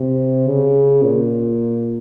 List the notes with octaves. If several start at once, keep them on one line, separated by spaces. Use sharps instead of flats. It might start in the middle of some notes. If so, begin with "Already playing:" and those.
Already playing: C3
C#3
A#2